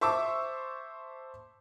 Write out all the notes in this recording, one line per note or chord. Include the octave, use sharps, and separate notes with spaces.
C5 E5 A5 C#6 D6 E6